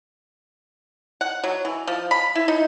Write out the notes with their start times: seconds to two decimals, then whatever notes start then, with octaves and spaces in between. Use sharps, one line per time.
1.21 F#5
1.44 F#3
1.65 E3
1.87 F3
2.11 B5
2.35 E4
2.48 D#4